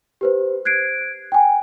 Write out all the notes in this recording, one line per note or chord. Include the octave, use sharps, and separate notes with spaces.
G4 B4 C5
F#6 G#6 C7 D7
G5 G#5